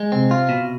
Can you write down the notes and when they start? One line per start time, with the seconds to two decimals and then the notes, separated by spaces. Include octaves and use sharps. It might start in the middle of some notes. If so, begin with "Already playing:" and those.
Already playing: G#3
0.12 C3 C4
0.31 F4
0.49 B2